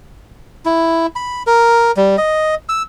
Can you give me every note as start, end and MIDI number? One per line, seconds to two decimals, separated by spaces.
0.65 1.07 64
1.16 1.43 83
1.47 1.91 70
1.97 2.16 55
2.17 2.55 75
2.69 2.83 88